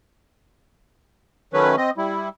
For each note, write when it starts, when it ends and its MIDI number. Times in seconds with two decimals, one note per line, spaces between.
1.53 1.76 51
1.53 1.76 54
1.53 1.76 57
1.53 1.76 61
1.53 1.76 71
1.77 1.90 60
1.77 1.90 75
1.97 2.29 55
1.97 2.29 64